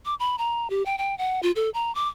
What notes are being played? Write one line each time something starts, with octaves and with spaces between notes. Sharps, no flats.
D6
B5
A#5
G4
G5
G5
F#5
F4
A4
A#5
D6